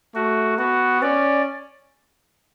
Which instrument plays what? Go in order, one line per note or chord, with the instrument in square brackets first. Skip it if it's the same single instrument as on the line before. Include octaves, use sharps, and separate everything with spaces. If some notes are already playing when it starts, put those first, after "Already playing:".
[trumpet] A3 [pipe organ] F#4
[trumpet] B3 [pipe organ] F#4
[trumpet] C#4 [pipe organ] D5